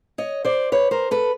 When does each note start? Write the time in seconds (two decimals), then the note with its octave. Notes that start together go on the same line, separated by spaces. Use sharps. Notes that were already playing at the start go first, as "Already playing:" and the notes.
0.18 C#5 D#5
0.45 C5 D5
0.72 B4 C#5
0.91 A#4 C5
1.11 A4 B4